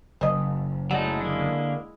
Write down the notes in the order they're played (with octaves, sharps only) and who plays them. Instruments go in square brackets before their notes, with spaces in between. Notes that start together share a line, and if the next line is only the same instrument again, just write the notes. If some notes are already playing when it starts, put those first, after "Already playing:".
[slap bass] F#1 [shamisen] C5 D#5
[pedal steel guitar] F#3 A3 D#4 [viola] G#3 E4 [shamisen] D5 F#5
[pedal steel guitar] D3 A#3